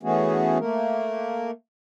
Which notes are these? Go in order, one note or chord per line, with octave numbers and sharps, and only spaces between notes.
E3 A3 B3 C#4 F#4 G#4
A3 A#3 A#4